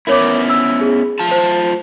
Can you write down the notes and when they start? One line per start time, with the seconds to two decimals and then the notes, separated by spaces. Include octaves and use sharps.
0.07 B3 C#4 E4 A#4 C#5 D6
0.49 E6
0.81 G#4
1.19 A3 F4 A5
1.31 C5